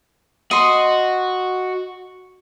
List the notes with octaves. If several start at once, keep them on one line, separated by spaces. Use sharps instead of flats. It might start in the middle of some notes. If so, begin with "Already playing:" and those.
F#4 D#5 C6